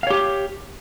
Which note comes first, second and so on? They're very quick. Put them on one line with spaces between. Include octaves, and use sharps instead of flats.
F5 C#5 G4